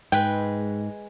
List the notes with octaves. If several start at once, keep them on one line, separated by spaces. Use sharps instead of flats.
G#2 G#3 B4 G5